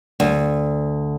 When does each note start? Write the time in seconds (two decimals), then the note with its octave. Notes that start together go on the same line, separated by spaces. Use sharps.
0.20 D2